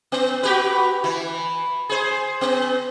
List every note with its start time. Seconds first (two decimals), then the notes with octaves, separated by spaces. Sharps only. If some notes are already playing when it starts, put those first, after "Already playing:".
0.12 B3
0.43 F#4 G4 B4
1.04 E3
1.89 G#4 C5
2.41 B3